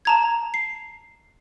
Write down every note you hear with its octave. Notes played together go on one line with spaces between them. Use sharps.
A5 A#5 G#6
C7